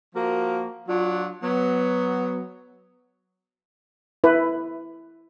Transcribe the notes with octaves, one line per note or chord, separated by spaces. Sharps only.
F3 A#3 F#4 A#4
F#3 D4 F4
F#3 B3
E4 B4